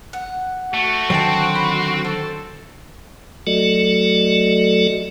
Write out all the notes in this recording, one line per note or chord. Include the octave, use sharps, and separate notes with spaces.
F#5
A3 F#4
D3 D#3 F#3 C4 G5 A5
B5
A4 C5
F#3 A3 F#4 A4 D5 D#5